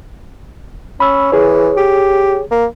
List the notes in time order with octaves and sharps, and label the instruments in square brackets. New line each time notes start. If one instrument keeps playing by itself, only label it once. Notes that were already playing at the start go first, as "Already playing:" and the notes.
[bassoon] C#4 [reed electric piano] B5 E6
[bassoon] E3 [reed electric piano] G#4 C#5
[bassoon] G4
A#3